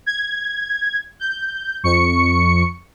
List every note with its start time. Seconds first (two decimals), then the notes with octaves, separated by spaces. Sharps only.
0.06 G#6
1.20 G6
1.83 F2 C#6 C#7